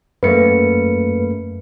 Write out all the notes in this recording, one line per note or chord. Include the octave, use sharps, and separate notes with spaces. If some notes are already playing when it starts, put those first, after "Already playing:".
F#2 A3 A#3 B4 C#7